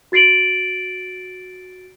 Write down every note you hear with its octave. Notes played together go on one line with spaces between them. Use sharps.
F#4 A6 C7 D7 F#7